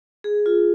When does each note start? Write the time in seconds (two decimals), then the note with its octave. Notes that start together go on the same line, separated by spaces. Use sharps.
0.24 G#4
0.46 F4